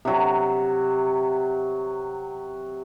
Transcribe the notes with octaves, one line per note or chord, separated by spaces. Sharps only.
C3 F#3